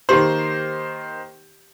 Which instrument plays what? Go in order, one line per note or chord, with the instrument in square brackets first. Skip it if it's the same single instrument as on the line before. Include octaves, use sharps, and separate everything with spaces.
[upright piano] D#3 A#3 C5 [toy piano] G4 C6